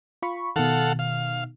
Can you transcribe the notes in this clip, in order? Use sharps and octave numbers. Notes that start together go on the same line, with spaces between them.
F4 B5 C#6
B2 D#3 A4 F5 F#5
F5